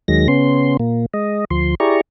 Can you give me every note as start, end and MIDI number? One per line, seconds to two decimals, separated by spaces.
0.08 0.28 39
0.08 0.28 51
0.08 0.28 54
0.08 0.28 56
0.08 0.28 94
0.28 0.77 49
0.28 0.77 59
0.28 0.77 61
0.28 0.77 84
0.80 1.06 46
0.80 1.06 58
1.14 1.45 56
1.14 1.45 75
1.51 1.75 38
1.51 1.75 53
1.51 1.75 84
1.80 2.01 64
1.80 2.01 67
1.80 2.01 68
1.80 2.01 74
1.80 2.01 82
1.80 2.01 85